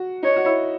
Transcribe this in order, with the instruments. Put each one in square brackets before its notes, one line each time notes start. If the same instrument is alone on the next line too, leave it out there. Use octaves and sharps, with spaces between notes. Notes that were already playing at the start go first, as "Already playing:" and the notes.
Already playing: [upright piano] F#4
[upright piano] D#4 [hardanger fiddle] C#5
[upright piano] F#4
E4